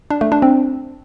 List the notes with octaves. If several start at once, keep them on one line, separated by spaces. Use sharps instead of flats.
D4
A3
D4
C4